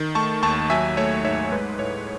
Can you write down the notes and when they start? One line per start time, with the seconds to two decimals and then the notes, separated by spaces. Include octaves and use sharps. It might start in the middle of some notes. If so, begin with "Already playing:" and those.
Already playing: D#3
0.15 A3 A5 C#6
0.43 D#2 A5 C#6
0.70 F#3 E5 G#5
0.97 A3 C#5 E5
1.24 G#2 C#5 E5
1.52 G#3 B4
1.79 A2 C#5